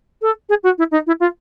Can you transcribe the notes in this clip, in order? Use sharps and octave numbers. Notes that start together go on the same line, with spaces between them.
A4
G#4
F#4
E4
D#4
E4
F4